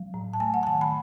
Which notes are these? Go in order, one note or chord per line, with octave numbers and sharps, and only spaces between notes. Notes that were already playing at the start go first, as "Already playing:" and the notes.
Already playing: F#3
A2
A5
A3 G#5
F#5
A5
D#3 G#5
B5